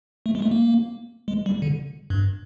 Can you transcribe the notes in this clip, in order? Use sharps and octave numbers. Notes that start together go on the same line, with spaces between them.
A3
G#3
A3
A#3
G#3
G3
D3
G2